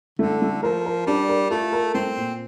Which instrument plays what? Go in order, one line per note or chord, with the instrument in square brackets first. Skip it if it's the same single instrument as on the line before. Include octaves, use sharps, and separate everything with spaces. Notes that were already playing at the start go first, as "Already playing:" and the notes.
[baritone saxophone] D3 [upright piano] A3
[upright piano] A3
[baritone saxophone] F3 [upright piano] A#4
[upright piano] A#4
[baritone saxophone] G3 [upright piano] D4
[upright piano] A#4
[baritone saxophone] A3 [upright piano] F4
[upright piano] A#4
[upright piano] A3 [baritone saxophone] C4
[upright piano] A#2